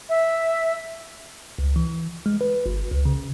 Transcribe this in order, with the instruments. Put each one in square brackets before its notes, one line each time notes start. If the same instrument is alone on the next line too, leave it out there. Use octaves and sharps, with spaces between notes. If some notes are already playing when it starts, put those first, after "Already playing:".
[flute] E5
[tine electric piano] C#2
E3
G#3
B4
G1
C#2
C#3